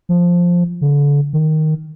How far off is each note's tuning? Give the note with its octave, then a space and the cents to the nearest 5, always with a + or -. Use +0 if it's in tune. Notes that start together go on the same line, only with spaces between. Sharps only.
F3 +5
D3 -35
D#3 +0